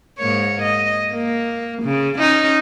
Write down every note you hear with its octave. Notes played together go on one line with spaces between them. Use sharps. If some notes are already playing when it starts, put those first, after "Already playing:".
G#2 A#3 C#5
D#5
A#3
C#3
C#4 D#4